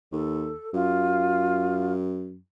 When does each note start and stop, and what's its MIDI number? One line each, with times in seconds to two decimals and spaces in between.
0.12 0.53 39
0.12 0.69 69
0.73 2.38 42
0.73 1.92 65